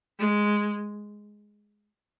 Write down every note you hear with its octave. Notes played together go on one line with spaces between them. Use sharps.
G#3